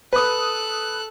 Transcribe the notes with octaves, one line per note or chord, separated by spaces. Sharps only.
A4 B4 D#6 F#6